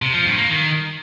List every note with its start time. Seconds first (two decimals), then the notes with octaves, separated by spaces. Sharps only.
0.02 C3
0.14 F3
0.26 G2
0.37 A#3
0.49 D#3